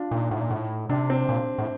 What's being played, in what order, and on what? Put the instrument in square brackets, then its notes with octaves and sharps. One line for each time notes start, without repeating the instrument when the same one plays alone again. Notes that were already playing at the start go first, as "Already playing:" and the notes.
Already playing: [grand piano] D4 F4
[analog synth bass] A#2 [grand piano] D#4
[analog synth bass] A2
A#2
A2
[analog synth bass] C3 [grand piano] D4
[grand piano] C4
[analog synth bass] A#2
A2